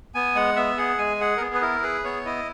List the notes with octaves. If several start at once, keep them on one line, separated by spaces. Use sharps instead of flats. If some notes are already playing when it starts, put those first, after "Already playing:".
B3 G#5
G#3 F#5
B3 E5
G#4 F#5
G#3 G#5
G#4 F#5
A#4
B3 G#4
B4
E4 A#4
G#4 B4
B3 C#5
E4 D#5